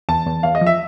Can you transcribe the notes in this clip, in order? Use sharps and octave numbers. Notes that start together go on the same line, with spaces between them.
E2 A5
E2
E2 F5
D#5
F3
E5